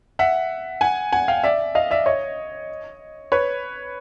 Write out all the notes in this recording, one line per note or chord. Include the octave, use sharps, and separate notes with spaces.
E5 F#5
F#5 G#5
F#5 G#5
F5 G5
D5 E5
D#5 F5
D5 E5
C#5 D#5
B4 C#5